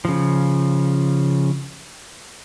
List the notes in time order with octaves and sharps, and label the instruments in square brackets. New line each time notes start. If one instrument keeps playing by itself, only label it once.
[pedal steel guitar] C#3 F3